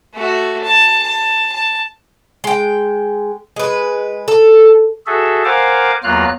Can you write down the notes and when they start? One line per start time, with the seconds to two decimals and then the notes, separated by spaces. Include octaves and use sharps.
0.14 A3 F#4
0.64 A5
1.03 A5
1.52 A5
2.44 G#3 G5
3.56 G#3 B4
4.28 A4
5.07 F#4 G#4 A4 E5
5.45 A#4 C5 F5 F#5 G#5 D6
6.04 E2 F#3 A#3 F4 F6 F#6